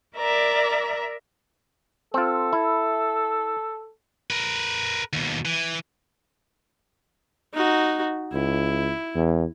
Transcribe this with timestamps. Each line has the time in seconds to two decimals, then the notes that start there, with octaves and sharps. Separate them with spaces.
0.17 A#4 D5 E5 A#5
2.14 C4 F4 A4
2.53 E4
4.30 A#4 B4
5.13 D#2 B2
5.45 E3
7.54 D#4 F#4
8.33 C#2 E4
9.15 E2